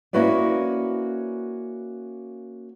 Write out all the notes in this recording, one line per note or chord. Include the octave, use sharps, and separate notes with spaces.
A#3 C#4 E4 F#4 B4 D5